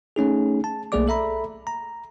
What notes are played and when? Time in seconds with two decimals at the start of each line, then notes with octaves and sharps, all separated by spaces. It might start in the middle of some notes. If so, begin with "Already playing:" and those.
0.16 A3 C#4 D#4 G#4
0.64 A5
0.92 B1 A3 A#3 G#4 D5 D6
1.08 A4 E5 A#5 B5
1.67 A#5